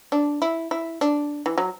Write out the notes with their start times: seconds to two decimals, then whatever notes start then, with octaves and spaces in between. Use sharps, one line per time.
0.12 D4
0.42 E4
0.71 E4
1.01 D4
1.46 E3
1.58 F#3